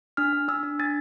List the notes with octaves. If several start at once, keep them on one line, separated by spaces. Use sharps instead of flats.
D4 F6
D4
D4 E6
D4
D4 A6